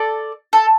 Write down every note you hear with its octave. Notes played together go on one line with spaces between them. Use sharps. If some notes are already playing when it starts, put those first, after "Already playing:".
Already playing: A4 D5
A4